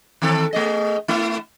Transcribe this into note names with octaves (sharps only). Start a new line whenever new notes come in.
D#3 C4 A4
A3 G#4 D#5
A3 E4